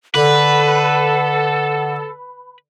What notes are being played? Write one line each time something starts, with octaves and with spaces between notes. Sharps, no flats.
D3 A4 B4 F#5